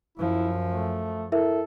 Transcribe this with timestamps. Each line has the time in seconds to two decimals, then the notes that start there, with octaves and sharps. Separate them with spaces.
0.18 F#2 F3 E4
0.69 A3
1.32 E4 A4 A#4 E5